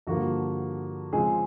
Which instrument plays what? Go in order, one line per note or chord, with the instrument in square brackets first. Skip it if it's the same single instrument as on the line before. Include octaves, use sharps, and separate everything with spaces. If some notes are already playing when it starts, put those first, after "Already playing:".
[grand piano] G2 D3 F3 A#3 F#4
C#3 F3 G#3 C4 G#4